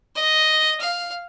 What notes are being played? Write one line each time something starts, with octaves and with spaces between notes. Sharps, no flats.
D#5
F5